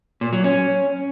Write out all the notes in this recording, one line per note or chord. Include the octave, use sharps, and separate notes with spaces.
A#2
F#3
C#4